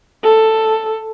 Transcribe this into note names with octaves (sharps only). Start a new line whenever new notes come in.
A4